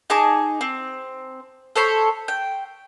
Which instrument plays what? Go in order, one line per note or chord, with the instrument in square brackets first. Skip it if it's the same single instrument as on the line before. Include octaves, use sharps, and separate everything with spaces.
[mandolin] D#4 G#4 A5 D6
C4
A4 C5 C#5 B5
G5